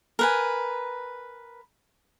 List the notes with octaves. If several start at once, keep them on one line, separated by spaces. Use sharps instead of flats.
A#4 B4 G#5